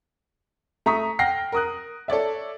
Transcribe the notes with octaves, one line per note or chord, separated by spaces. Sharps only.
A3 A#5 C#6 D#6 B6
F#5 G5 F6 A#6 C7
A#4 D#6 F#6
A4 C#5 D5 E5